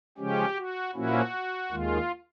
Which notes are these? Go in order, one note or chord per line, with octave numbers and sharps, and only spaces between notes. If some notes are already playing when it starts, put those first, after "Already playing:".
C#3 F3 G#3 C#4 G4
F#4
A#2 F3 A#3 C#4 E4 F#4
D#2 D#3 G#3 F4